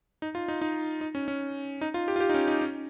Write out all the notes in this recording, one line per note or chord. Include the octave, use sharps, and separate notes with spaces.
D#4
F4
D#4
D#4
D#4
C#4
C#4
D#4
F4
G4
F4
G4
D#4
C#4
D#4
C#4